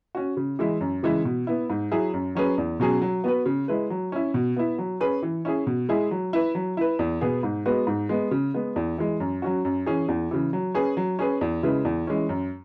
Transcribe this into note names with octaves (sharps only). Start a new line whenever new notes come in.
C#4 F#4
C#3
E3 G#3 E4
F#2
C#3 E3 G#3 E4
B2
B3 E4
G#2
F#3 E4 G#4
F#2
F#3 C#4 G#4 B4
E2
B2 F#3 C#4 G#4
F#3
B3 F#4 B4
C#3
G#3 E4 B4
F#3
C#4 E4
B2
B3 E4
F#3
C#4 G#4 B4
E3
C#4 E4 G#4
B2
G#3 E4 G#4
F#3
E4 B4
F#3
E4 B4
E2
B2 B3 G#4
G#2
G#3 B3 F#4 B4
G#2
G#3 B3
C#3
G#3 B3
E2
E3 G#3
F#2
F#3 C#4 F#4
F#2
E3 C#4 G#4
E2
C#3 E3
F#3
C#4 G#4 B4
F#3
C#4 G#4 B4
E2
C#3 G#3 E4 B4
E2
E3 G#3 C#4
F#2